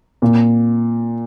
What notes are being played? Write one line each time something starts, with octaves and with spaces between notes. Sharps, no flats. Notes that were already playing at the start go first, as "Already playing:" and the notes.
A#2